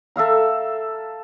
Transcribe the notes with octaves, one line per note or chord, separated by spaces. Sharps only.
A4 E5 F5 A#5